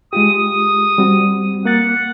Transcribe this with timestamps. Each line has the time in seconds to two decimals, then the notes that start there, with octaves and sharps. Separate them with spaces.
0.13 G#3 F4 G4 D#6
0.98 G3 C4 F#4
1.65 A#3 F#5 A6